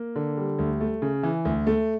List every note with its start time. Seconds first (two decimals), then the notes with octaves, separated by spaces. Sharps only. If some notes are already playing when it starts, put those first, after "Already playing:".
Already playing: A#3
0.16 D3
0.37 G3
0.59 D2
0.81 A3
1.02 C#3
1.23 E3
1.45 D2
1.67 A3